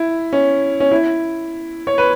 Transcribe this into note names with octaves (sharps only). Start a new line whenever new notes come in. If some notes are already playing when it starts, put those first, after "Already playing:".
Already playing: E4
C#4
C#4
E4
C#5
B4